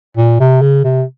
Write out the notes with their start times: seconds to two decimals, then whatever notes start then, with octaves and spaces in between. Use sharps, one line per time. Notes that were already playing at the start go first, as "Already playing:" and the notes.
0.17 A#2
0.40 C3
0.61 C#3
0.84 C3